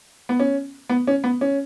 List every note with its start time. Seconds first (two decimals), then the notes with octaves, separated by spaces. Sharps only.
0.29 B3
0.40 C#4
0.89 B3
1.07 C#4
1.24 B3
1.41 C#4